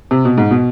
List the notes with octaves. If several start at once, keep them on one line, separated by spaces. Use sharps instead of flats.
C3
B2
G#2
B2